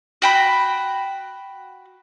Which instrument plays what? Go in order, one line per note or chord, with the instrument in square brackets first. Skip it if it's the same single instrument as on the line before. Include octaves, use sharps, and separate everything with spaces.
[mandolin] F#4 G5 B5